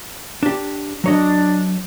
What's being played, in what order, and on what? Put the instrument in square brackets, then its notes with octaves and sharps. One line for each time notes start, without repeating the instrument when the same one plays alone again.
[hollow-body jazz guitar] D4 G4
[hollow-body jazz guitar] F#3 C#5 D#5 [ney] D4